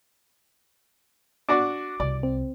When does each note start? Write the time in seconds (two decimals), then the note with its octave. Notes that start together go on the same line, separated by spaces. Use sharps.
1.49 D4 F#4 D5 D6
2.00 C2 D5
2.23 C4